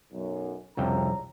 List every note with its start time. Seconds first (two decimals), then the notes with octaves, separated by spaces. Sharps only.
0.12 B1 F#2
0.77 C2 F2 C#3 C#5 G5 A#5